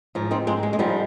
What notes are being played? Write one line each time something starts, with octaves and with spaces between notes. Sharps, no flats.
G#2 F3
C4 D#4
G#3 C4
G#3
G#3
G#2 F3 G3